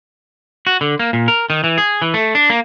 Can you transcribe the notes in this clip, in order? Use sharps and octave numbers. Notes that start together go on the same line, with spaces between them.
F#4
D3
A#3
A#2
A#4
D#3
E3
G#4
E3
A3
D4
A#3